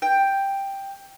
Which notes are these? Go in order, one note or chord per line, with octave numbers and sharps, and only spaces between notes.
G5